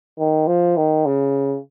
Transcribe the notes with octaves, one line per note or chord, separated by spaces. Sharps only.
D#3
F3
D#3
C#3